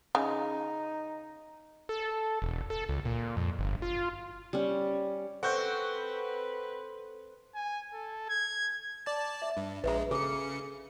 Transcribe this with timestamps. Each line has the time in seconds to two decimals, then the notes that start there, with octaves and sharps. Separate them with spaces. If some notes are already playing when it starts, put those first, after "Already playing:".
0.15 C#3 D#4
1.89 A4
2.42 E1
2.70 A4
2.89 C#2
3.05 A#2
3.37 F2
3.59 G1
3.82 F4
4.53 G3 C#4
5.43 C4 A4 B4 F#5 C#6 G6
7.55 G#5
7.93 A4
8.29 G#6
9.06 D5 A5
9.42 E5
9.57 G2
9.84 A#1 G#3 B4 E5 A#5
10.11 C#3 G#4 A4 C#7